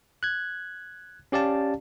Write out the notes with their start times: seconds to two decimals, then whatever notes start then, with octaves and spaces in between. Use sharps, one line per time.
0.23 F#6 G#6
1.32 C#4 G4 D5 F5 A5